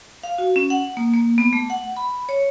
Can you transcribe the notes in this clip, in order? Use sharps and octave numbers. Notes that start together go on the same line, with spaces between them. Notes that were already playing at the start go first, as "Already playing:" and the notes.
F5
F#4
C#4
F#5
A#3
A#3
B3
A3
F#5
B5
C#5